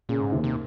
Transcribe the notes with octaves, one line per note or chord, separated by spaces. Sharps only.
A#2 C#3
G#2
D#2 C3
C3